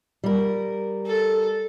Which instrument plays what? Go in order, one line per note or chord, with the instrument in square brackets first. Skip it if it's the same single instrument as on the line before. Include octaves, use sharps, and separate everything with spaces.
[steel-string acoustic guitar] G3 A#4
[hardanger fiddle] A4